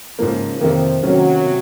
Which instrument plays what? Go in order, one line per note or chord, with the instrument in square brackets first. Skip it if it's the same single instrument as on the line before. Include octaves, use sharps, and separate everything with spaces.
[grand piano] G#2 F3 A#3 [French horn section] C#3
[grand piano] F2 C3 D#3 A#3 [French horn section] F3
[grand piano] C3 D#3 A#3 C#4 [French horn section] F#3
[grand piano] C3